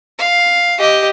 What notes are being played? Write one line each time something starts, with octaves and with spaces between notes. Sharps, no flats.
F5
G4 D#5